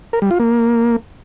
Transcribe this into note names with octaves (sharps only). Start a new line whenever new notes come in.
A#4
G3
F4
A#3